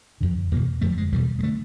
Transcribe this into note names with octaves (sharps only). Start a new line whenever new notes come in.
F2 D3
E2 B2 A#3
F2 D3 A3
G3
G#3
E2 B2 G3
G#3
D3 A3